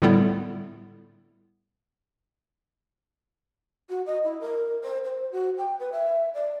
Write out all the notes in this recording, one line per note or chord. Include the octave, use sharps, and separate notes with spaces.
A2 D3 G3 B3 E4
F#4
D#5
E4
A#4
C5
C5
F#4
G5
B4
E5
D5